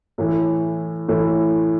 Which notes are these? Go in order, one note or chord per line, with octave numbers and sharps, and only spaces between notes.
A2 E3 A3
A2 E3 A3